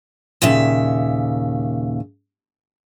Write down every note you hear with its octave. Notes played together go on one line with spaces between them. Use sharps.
D#2 A#2 C#3 E5